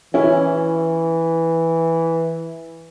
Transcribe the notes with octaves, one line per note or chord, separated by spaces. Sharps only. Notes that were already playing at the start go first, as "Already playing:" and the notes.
E3 C#4 E4